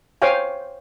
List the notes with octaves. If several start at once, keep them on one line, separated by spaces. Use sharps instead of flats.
C5 C#5 F5 G5 G#5